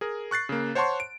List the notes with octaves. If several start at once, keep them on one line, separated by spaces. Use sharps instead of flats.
G#4 A#4
C#6 F#6 A6 C7
C#3 A#3
C5 C#5 F#5 A5 C6 C#6
D7